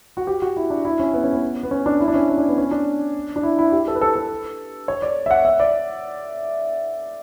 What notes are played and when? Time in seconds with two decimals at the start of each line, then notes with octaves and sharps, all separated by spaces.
0.17 F#4
0.27 G4
0.42 F#4
0.57 E4
0.70 D4
0.85 E4
0.99 C#4
1.13 B3
1.24 C#4
1.33 B3
1.63 B3
1.71 C#4
1.86 D4
2.00 E4
2.08 D4
2.14 C#4
2.29 C#4
2.38 D4
2.48 B3
2.58 C#4
2.71 D4
3.36 D4
3.43 E4
3.59 E4
3.72 G4
3.88 A4
3.95 B4
4.01 A4
4.16 A4
4.88 C#5
5.02 D5
5.26 E5
5.31 F#5
5.45 E5
5.60 D5